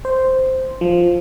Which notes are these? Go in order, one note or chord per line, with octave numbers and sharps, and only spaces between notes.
C5
F3